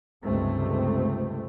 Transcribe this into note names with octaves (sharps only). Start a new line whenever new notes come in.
C#2 G2 C3 A3 C4